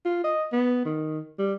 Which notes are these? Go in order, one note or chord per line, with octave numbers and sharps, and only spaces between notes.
F4
D#5
B3
D#3
G3